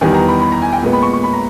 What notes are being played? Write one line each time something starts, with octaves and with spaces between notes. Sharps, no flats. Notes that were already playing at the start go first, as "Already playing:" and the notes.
E2 D#3 G3 B3 G#5
A#5
B5
B5
A#5
G#5
G5
A#2 G#3 B3
B5
C#6
C#6
B5
A#5